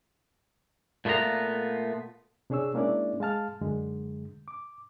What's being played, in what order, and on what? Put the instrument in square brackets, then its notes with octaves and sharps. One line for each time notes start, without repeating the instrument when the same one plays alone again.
[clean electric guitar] A#2 A3 B3 F4 A#5
[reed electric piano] C3 D4 G#4 C#5 E6
G#3 A#3 C#4 D4 E4 D5
G#3 F5 A5 F6
F#2 D3 G#3
D6